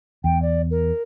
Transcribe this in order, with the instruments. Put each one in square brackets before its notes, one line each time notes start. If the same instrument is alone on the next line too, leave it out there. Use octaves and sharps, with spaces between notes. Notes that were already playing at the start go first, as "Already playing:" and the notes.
[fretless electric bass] E2 [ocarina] G5
[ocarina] D5
A#4